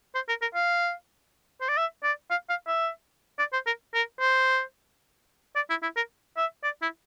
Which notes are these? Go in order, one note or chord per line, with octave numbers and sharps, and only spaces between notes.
C5
A#4
A#4
F5
C5
D5
E5
D5
F5
F5
E5
D5
C5
A#4
A#4
C5
D5
E4
E4
A#4
E5
D5
E4